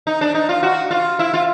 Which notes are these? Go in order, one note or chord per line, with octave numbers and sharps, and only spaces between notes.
D#4
D4
D#4
F4
F#4
F4
E4
F4